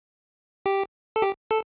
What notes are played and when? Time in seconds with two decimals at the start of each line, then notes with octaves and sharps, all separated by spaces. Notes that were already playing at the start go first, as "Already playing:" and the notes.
0.66 G4
1.16 A4
1.22 G4
1.51 A4